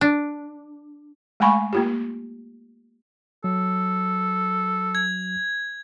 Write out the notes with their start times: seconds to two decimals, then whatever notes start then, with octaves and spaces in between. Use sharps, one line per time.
0.01 D4
1.40 G#3 A3 F5 G#5 B5 C#6
1.73 A#3 F4 G4
3.44 F#3 A4
4.95 G#6